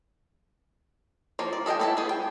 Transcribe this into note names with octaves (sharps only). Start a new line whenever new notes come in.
F3 A#3 A#4
D5
A4 D#5 F5 G5 G#5
B3 E4 A4 B4 A5
B3 G#4
G5